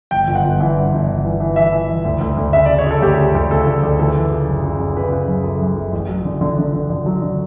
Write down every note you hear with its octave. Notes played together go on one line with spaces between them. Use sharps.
G1 G5
G1
F#5
G1
E3 F#5
G2
G1
G1
E3
E3
E3 E5
E3
E3
D2
D2
D2
C#3 E5
D5
C#3
C#5
C#3 A4
D2 G4
C#3
D2
C#3 A4
D2
D2
E3 A4
E3
C#3
F#1
C#3
C#3
C#3 B4
C#3
F#2
C#3 A4
F#2
F#1
A1
F#3
D3
D3
D3
D3
D3
F#3
D3